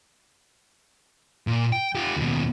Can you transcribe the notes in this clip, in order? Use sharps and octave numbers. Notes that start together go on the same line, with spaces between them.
A#2
G5
F4 G4
D#2 B2